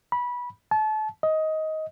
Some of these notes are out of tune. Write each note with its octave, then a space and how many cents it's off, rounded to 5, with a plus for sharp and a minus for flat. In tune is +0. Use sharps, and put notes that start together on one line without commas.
B5 -20
A5 -30
D#5 +15